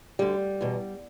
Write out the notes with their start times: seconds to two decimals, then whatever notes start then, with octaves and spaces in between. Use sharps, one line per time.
0.19 D2 D3 G3
0.61 E2 B2